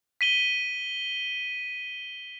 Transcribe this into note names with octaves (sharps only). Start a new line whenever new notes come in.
B6 D#7 G7